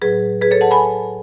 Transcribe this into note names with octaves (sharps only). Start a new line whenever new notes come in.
A2 F#3 G#4 B4
G#4 B4
A4 C#5
F#5 A5
G#5 B5